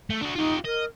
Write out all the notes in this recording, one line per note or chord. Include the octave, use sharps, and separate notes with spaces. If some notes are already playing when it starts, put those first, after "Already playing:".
A3
D4 F#4
D#4 F4 G4
A#4 D#5